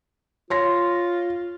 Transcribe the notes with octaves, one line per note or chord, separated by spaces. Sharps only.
F4 C#5 C6 A#6